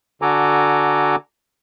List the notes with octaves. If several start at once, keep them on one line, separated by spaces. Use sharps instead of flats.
D3 F#4 A4 G#5 A#5 D6